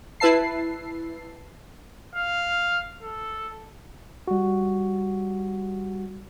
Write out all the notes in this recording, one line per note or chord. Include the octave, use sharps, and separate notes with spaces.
E4 B4 E5 A5 C7
F5
A4
G3 F#4